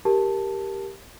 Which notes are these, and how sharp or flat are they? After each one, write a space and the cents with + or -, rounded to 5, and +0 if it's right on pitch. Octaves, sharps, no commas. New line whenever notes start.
G4 +0 A#4 +0 A5 +0